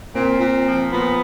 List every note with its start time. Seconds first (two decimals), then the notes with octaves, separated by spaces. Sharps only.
0.14 A#2 C4
0.40 A#2
0.66 F3
0.91 A#2 B3